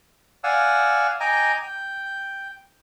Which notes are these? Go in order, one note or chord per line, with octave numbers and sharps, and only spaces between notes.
D5 F5 F#5 G#5 E6
D#5 G5 G#5 A#5 D6
G5